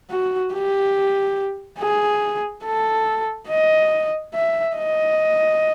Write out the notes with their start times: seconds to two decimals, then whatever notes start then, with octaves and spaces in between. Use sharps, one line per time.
0.10 F#4
0.53 G4
1.79 G#4
2.65 A4
3.49 D#5
4.34 E5
4.77 D#5